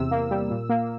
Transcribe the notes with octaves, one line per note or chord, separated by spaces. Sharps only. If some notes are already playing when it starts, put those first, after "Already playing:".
Already playing: E2 C3 E6
A#3
G3
A#2
A#3